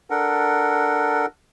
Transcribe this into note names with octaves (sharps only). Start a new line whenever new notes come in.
D4 A4 A#4 F#5